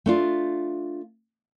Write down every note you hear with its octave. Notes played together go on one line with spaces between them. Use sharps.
A3 D4 F4